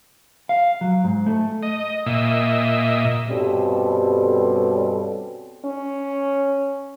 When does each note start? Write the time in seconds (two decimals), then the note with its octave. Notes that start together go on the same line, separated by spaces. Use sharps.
0.49 F5
0.81 F#3
1.04 G#2
1.26 A3
1.63 D#5
2.06 A#2 D#5 E5
3.28 G2 B2 G3 C4 C#4 A4
5.65 C#4